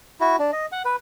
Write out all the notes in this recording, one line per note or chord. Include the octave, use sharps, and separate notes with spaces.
E4 F#4
D4
D#5
F#5
B4